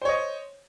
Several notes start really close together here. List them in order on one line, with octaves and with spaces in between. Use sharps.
C5 C#5 D#5